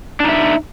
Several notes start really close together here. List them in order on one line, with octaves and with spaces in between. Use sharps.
D4 D#4 E5